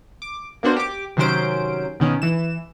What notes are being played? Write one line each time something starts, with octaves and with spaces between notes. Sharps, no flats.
D6
A#3 B3 D4 F#4 C5
G4 D6
C3 D#3 F#3 C#4 C5 D7
B2 D#3 C#4
E3 E7